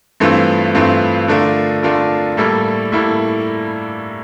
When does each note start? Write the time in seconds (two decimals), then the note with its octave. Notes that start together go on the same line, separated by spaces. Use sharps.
0.20 G2 E3 A3 C4 F4
0.75 G2 E3 A3 C4 F4
1.28 D3 A3 D4 F4 A#4
1.83 D3 A3 D4 F4 A#4
2.37 A2 G3 A#3 E4 A4
2.92 A2 G3 A#3 E4 A4